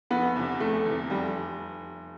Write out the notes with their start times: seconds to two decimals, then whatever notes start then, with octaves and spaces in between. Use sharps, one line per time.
0.11 F1 B3
0.36 E2 C3
0.60 F1 A3
0.86 E2 C3
1.10 F1 G3